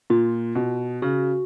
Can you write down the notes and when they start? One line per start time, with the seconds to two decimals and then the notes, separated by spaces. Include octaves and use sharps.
0.10 A#2 F4
0.55 B2
1.02 C#3 F#4